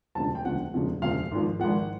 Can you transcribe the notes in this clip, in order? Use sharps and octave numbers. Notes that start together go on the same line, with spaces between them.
E1 D2 C#3 F3 A5
G5
E1 D2 C#3 F3 F#5
E1 D2 C#3 F3
E1 D2 C#3 F3 F5
G#1 G#2 F3
G#1 G#2 F3 F#5